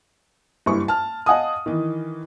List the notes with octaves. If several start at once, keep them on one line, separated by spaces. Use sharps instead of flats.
F#1 G2 E4 C#6
A5 F6
D#5 F5 F#5 G#5 A5 D#6
D#3 E3